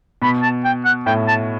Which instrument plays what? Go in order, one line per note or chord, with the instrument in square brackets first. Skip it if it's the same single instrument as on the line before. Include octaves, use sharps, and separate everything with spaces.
[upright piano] B2 [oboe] B5
[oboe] A5
G5
F#5
[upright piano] A2 [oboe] G5
[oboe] A5